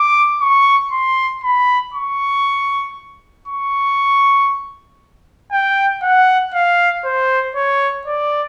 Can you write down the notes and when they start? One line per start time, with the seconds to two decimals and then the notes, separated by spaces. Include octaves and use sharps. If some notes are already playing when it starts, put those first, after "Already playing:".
Already playing: D6
0.41 C#6
0.92 C6
1.44 B5
1.94 C#6
3.48 C#6
5.52 G5
6.03 F#5
6.54 F5
7.05 C5
7.55 C#5
8.07 D5